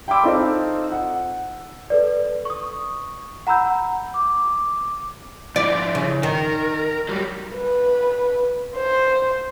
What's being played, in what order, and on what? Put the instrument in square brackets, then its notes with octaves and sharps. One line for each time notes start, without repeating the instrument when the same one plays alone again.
[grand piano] G5 B5 C6 D6 E6
C4 D#4 F4 A4 C5
F#5
[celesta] A4 B4 D5
C#6 D#6
F#5 A#5 B5 E6 G6
[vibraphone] D6
[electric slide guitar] F3 E4 [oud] D5
[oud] C#3
[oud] D#3 [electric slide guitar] A#4
[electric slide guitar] F#3 G3
[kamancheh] B4
C5